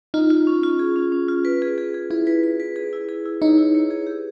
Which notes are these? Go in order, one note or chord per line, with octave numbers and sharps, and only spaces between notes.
D#4 F4
F4
C#4
F4
G#4
C#4
C#4
F4
B4
G#4
G#4
G#4
E4 G#4
B4
B4
B4
G#4
E4
G#4
E4
D#4 C#5
E4
C#5
G#4
G4